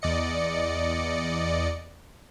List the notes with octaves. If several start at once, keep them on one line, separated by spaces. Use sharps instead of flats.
E2 D5 D#5 C#7